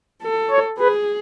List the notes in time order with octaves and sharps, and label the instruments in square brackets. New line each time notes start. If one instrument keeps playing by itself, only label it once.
[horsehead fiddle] A4
[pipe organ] C#5
[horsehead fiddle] G#4 [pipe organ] B4